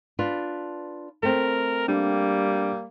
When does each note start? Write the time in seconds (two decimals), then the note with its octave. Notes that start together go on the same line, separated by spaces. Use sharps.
0.19 D4 F4 B4
1.23 A3 C4 A#4
1.88 G3 A#3 D4